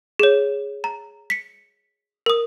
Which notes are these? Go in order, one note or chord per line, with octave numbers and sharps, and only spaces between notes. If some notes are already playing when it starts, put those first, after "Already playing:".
G#4 C#5
A#5
B6 C#7
A#4 D#6